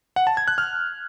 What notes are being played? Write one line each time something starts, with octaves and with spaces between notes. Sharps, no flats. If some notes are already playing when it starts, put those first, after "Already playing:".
F#5
A5
G#6
F#6
F6